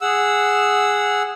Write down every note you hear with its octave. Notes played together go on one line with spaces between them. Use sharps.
G#4 F#5 E6